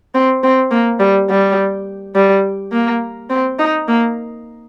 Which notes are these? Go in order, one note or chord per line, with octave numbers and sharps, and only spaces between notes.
C4
C4
A#3
G3
G3
G3
A#3
C4
D#4
A#3